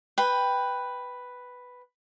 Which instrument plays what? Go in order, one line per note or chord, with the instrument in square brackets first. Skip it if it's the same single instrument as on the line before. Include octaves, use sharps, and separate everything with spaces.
[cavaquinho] B4 G5